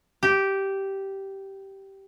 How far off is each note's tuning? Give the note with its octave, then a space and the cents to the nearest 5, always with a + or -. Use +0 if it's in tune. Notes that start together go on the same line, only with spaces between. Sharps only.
G4 -10